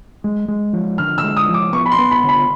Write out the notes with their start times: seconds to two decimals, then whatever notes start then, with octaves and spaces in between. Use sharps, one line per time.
0.24 G#3
0.48 G#3
0.73 F3
0.98 D3 F6
1.18 E6
1.24 G#3
1.36 D#6
1.49 F3
1.54 D6
1.73 B3 C#6
1.86 B5
1.92 C6
1.99 B3
2.11 B5
2.24 D3
2.29 B5